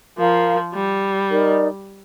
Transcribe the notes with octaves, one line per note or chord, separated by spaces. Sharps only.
F3 A#4 F5 A#5
G3
D#4 A#4 D5